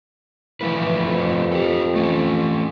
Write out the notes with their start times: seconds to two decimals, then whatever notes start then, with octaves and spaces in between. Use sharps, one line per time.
0.61 E3 F3 A3 B4
1.06 F2
1.52 G4 A4
1.96 A3 C#4